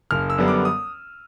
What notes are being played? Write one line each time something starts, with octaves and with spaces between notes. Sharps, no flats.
F#1 F6
E6
F#2 D3 G3 B3
D6
D#6